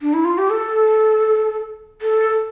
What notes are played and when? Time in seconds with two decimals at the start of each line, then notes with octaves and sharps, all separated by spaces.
0.01 D4
0.14 E4
0.25 F4
0.38 G4
0.50 A4
2.02 A4